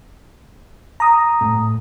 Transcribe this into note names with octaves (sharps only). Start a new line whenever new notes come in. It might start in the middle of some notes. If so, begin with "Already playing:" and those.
A#5 D#6
A2